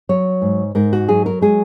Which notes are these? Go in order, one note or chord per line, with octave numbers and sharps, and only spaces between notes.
F#3 C#5
G#2
G#2 A#4
F#4
F#3 G#4
A#4
G#3 G#4